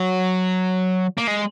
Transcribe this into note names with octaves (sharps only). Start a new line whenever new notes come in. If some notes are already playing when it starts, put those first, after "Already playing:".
Already playing: F#3
A#3
G#3